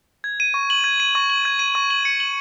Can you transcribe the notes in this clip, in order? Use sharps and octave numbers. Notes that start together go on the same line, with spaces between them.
G#6
D#7
C#6
F#7
G#6
D#7
C#6
F#7
G#6
D#7
C#6
F#7
C#7
F#7